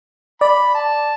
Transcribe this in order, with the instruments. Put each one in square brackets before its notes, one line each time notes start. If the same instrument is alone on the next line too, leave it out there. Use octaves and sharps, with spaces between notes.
[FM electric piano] D5 [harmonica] B5
[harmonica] A5